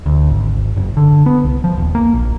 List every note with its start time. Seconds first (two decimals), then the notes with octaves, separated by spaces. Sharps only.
0.06 D2
0.30 G#1
0.76 F#1
0.97 D3
1.26 B3
1.44 C2
1.64 F3
1.78 D#1
1.95 A#3
2.13 A#1